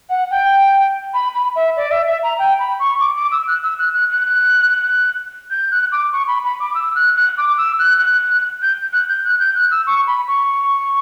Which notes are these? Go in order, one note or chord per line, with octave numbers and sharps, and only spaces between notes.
F#5
G5
B5
B5
E5
D5
E5
E5
A#5
G5
B5
C#6
D6
D6
E6
F#6
E6
F#6
F#6
F#6
G6
F#6
D6
C#6
B5
B5
D6
E6
F#6
F#6
D6
E6
F#6
F#6
G6
F#6
G6
F#6
G6
F#6
E6
C#6
B5
C#6